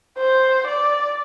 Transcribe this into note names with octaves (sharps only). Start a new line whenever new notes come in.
C5
D5